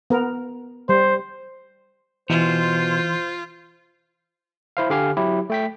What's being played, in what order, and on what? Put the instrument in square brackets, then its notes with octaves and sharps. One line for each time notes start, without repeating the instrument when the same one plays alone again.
[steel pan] B3 A#4
[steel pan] G3 [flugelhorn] C5
[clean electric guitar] B2 [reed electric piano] E3 [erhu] F4 [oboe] C5
[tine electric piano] E4 C5 F5
D3 G4 F5 G#5 F6
F#3 E4 G4
A3 G5 B6